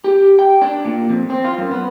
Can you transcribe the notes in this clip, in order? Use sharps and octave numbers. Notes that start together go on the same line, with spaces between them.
G4
G5
D4
A#2
F2
C4
F4
F#2
B3